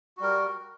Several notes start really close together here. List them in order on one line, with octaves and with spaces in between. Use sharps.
F#4 G3 A#4